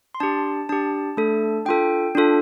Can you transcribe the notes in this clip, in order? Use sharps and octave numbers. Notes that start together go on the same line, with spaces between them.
C6
D4 G4 A5
D4 G4 A5
A3 D4 A4
D4 F4 A4 G5
D4 F4 A4